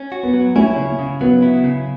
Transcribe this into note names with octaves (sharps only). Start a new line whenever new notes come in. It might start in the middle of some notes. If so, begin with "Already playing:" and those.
Already playing: C#4
F#4
B3
F#3
C#4 E4
C#3
C#3
F#3 B3
E4
C#3